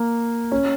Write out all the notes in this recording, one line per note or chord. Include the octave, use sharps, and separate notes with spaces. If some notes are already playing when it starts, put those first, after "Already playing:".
Already playing: A#3
C#4